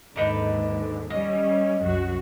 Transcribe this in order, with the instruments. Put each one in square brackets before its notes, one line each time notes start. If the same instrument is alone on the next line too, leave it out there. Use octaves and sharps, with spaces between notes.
[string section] D#2 G#2 D3 [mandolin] D4 D#4 B4
[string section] G3 C#4 [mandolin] D#5
[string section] C2 F#2 F#4